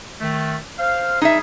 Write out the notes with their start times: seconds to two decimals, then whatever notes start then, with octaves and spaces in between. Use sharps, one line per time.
0.21 D#3 A3
0.79 C5 F5
1.22 G3 D#4 G#4 E5